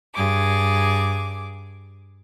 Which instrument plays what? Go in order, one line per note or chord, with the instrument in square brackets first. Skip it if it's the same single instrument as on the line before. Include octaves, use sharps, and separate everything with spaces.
[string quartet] G2 G#4 D6